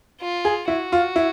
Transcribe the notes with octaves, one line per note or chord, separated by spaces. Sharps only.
F4
G#4
E4 F#4
F4
E4